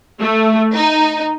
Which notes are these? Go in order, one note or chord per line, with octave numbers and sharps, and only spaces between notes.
A3
D#4